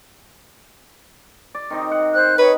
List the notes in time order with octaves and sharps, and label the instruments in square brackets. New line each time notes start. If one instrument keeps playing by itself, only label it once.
[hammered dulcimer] D5
D#3 C4 D#4
F#5
[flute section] C5 F#6
[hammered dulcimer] D#3 [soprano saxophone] B4 [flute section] C#5